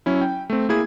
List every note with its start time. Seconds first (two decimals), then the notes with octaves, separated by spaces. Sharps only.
0.06 F#3 C#4 E4
0.21 G5
0.50 A3 C4
0.69 A#3 E4 G#4 G#6